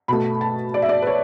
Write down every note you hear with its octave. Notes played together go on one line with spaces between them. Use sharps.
B2 A3 B5
A5
D5
E5
D5
B4
C#5